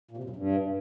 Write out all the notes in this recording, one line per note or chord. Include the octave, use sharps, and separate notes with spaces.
A#2
C3
F#2
E2
G2